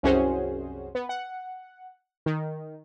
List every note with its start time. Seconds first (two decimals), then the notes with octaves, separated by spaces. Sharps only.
0.03 C2 F#2 C#4 F#4 G#4 C5
0.95 B3
1.09 F#5
2.26 D#3